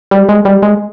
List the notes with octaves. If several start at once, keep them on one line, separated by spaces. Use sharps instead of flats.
G3
G#3
G3
G#3